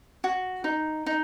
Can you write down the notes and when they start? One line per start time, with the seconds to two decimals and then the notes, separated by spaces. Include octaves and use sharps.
0.24 F#4
0.64 D#4
1.06 D#4